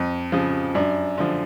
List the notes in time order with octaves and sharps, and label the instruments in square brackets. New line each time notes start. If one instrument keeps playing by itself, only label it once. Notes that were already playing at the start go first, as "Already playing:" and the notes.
Already playing: [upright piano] F2
C#3 F3
F#2 D4
D3 F3